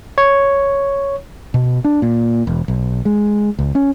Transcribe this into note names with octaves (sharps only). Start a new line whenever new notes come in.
C#5
B2
D4
A#2
E1
B1
G#3
C#2
C#4